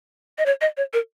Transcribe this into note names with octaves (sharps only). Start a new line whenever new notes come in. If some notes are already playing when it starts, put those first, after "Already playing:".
D#5
C#5
D#5
C#5
A#4